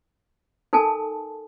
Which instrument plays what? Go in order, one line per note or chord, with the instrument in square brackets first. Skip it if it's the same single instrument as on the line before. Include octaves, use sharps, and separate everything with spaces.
[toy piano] D#4 A4 A#4 G#5 A5